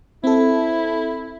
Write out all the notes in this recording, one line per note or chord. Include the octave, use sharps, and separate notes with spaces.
C4 E4 A4